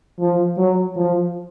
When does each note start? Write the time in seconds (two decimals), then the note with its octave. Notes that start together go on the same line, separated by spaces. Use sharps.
0.19 F3
0.57 F#3
0.96 F3